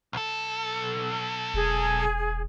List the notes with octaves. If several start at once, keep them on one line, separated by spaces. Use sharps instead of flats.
B1 A4
E1 G#4